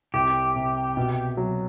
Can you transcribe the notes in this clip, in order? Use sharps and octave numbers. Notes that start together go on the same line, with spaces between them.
C2 G4
C3
B2
F#3